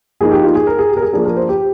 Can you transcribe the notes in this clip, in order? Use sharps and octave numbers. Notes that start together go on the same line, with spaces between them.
F3 A#3 D#4 G#4
G4
F4
G#4
A#4
G#4
G4
A#4
G#4
F3 A#3 D4 G#4
A#4
C5
G4